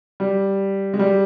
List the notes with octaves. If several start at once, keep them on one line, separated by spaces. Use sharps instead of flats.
G3
G#3
G3